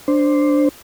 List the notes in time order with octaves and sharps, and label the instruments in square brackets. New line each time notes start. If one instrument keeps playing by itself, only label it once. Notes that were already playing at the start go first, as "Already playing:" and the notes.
[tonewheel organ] D4 C5